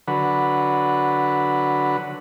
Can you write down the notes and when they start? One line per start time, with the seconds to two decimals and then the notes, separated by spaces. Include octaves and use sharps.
0.07 D3 F#3 B4